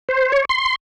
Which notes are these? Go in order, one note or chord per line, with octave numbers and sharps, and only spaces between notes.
C5
C#5
C6